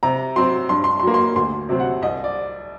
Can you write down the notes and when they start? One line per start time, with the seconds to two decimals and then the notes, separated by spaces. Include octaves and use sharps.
0.03 C3 A#5
0.36 F#3 C4 C6
0.69 G2 C6
0.84 C6
1.00 C6
1.03 F#3 A#3
1.14 C6
1.36 D2 C6
1.69 C3 F#3 C4
1.80 F#5
2.02 C2 D#5
2.24 D5